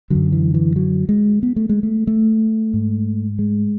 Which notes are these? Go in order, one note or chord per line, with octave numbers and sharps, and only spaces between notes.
F#2 D3 F#3
E3
E3
F#3
G#3
B3
A3
G#3
A3
A3
G#2
G#3